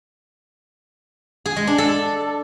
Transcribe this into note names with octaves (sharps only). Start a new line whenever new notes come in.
G#4
G#3
D4
A4